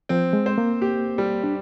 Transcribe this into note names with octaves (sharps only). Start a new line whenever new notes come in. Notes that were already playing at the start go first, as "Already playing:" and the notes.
F3 C4
G#3
C5
A#3
G4
G3
D4